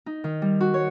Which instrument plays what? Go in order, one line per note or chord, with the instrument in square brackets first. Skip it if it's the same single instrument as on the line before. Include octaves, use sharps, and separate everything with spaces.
[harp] D#4
D#3
G3
F#4
C#5